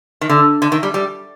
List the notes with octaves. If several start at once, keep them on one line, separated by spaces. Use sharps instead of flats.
D#3
D3
D3
D#3
G3
G3